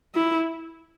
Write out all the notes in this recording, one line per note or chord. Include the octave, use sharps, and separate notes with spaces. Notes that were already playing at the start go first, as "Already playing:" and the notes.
E4